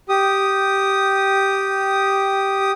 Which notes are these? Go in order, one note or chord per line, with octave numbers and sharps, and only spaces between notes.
G4 D#6